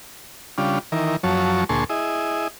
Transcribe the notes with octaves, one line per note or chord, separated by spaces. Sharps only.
C#3 G3 D4 F4
D#3 E3 A#4
F#2 F3 F#3 C#5 A5
D2 A#2 G#4 A5 C6 C#6
E4 G#4 D#5